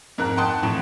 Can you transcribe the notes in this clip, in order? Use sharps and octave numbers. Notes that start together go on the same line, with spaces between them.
F2 G#2 A#4 F#6
F#5 G5 A5 C6 D#6 F#6
A1 F2 A2 G5 E7